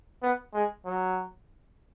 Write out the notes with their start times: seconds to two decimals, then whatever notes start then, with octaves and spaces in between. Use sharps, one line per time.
0.22 B3
0.54 G#3
0.85 F#3